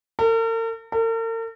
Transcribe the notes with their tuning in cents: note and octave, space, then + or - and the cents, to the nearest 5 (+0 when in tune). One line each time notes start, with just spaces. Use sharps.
A#4 -45
A#4 -45